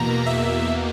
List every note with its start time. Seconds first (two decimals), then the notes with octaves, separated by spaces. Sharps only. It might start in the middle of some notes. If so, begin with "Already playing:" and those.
Already playing: E2 B2 A#3 A#5
0.26 E5